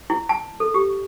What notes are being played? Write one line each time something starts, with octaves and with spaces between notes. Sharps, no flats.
E4
A5
A4
G4